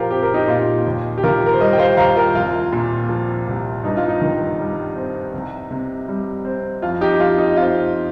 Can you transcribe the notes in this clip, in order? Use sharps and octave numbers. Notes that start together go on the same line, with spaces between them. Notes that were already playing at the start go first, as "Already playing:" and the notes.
Already playing: A#2 F3 F4 G4 A#4 C5
C4 G4
A#4
D#4 G4
A#2 F4
D#2
G4
D#3 F4 A#4
A#4
C5
G3 A#4 D#5
G5
C5 F5
D#2 F5 A#5
F4 A#4
C2 F4
A#2
F3
C2
G2 D#4
F4
D#4
D#3
G3
C4
C2
C3
G3
C4
F2 F4
D#4 G4
F3 F4
D#4
C4 F4